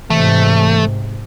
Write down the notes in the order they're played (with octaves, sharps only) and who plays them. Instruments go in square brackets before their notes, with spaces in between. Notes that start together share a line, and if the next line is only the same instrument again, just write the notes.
[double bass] G#2 C3 [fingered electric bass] E3 [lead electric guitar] A3